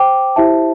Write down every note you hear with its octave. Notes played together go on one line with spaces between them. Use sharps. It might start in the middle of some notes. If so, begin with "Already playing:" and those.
Already playing: C5 G5 D6
E4 G4 C5 E5 A5